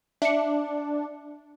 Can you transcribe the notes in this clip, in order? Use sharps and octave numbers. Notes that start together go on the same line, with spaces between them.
D4 E5 C#7